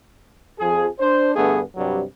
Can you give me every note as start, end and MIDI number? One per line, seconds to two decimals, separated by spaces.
0.60 0.87 41
0.60 0.87 53
0.60 0.87 68
1.00 1.33 62
1.00 1.33 72
1.36 1.61 43
1.36 1.61 50
1.36 1.61 57
1.36 1.61 59
1.36 1.61 68
1.77 2.03 43
1.77 2.03 48
1.77 2.03 54
1.77 2.03 55